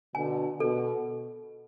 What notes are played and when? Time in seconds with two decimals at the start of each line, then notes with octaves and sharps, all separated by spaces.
0.15 B2 D3 G#5
0.60 B2 A4